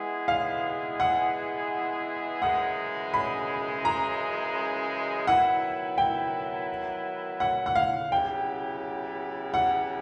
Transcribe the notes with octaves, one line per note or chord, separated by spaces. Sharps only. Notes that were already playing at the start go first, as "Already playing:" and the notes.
Already playing: E3 G#3 B3 E4 G#4
F5
F#5
F#2 C#3 E3 G#3 F#5
B5
A#5
D#3 F#3 B3 E4 F#5
G5
F#5
F#5
F5
C#3 F#3 B3 E4 G4 G5
F#5